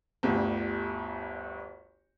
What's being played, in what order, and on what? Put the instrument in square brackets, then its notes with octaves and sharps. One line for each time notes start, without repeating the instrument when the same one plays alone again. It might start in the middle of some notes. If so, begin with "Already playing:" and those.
[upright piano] G1 D2 G4